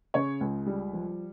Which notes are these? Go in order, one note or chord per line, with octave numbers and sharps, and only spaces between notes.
C#3 C#5
C#2
G3
F3